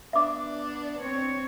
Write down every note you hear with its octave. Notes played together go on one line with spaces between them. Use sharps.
B3 D4 E5 D6
C4 C#5